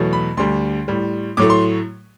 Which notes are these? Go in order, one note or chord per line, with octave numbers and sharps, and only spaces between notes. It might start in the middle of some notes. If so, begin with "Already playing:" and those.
Already playing: E2 B2 F#3 A3
B5
D2 D3 G3 C6
A2 G3
A2 F#3 A3 D6
C6